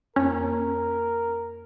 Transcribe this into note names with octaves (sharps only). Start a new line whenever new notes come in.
F2 A#3 C#4 A#4